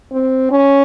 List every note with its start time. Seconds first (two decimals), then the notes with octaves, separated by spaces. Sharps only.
0.12 C4
0.51 C#4